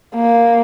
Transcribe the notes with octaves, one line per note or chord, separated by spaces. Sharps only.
A#3